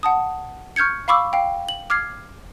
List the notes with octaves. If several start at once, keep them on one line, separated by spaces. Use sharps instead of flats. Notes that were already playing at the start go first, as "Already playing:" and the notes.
F#5 A5 D#6
C#6 F6 G6 G#6 C#7
F5 B5 C#6 D6 E6
F5 G5
F#7
D6 F6 G#6 C7